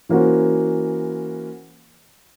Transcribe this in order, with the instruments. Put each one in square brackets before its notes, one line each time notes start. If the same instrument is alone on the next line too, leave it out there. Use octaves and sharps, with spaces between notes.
[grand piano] E3 A#3 C#4 F#4 C5